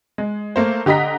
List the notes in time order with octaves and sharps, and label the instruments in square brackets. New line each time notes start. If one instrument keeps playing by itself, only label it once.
[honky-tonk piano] G#3
A3 A#3 C5
D3 G4 D#5 A#5 B6